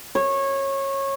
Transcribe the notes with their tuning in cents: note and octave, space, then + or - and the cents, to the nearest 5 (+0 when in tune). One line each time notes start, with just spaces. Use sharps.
C#5 -20